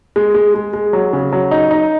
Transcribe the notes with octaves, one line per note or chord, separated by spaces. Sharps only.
G#3
G#3
G#3
G#3
F#3
C#3
F#3
D#4
D#4